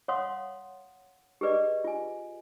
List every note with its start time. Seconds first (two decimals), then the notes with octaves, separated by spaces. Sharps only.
0.08 C#5 F5 F#5 C6 D#6
1.41 G4 G#4 B4 D5 D#5
1.84 F4 G#5